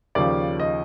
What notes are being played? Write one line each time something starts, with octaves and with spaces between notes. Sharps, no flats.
D#2 C#3 F3 D5
D#5